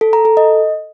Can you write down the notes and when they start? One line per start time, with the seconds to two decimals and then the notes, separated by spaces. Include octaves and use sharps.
0.01 A4
0.13 A#5
0.25 A4
0.37 D#5